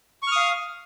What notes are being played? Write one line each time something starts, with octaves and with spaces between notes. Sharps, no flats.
F5 C#6 D#6 F6